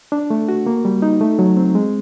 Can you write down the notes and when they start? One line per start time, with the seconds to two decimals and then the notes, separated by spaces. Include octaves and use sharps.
0.12 D4
0.30 A3
0.48 F#4
0.66 A#3
0.85 G3
1.02 D#4
1.21 A3
1.39 F#3
1.57 C4
1.75 G#3